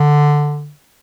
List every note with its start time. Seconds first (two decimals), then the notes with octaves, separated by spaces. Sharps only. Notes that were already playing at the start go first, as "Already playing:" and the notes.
Already playing: D3